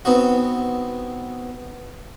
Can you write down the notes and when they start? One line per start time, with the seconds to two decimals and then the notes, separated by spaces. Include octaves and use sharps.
0.05 B3 C4 D#4 F#4